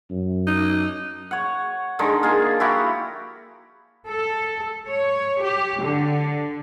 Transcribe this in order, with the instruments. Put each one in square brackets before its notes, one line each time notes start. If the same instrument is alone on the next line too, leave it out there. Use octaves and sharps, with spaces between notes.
[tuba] F#2
[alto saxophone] D#4
[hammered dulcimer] C#5 F#5
D3 D#3 G#3
A#3 F4 G#4
E4 F#4 G4
[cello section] A4
C#5
G4
D3